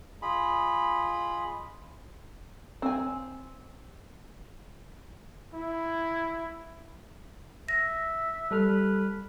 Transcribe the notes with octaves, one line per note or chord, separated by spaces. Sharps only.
F4 G#4 D#5 B5
C4 G#5
E4
E5 A#6
G3 A4 B4 F6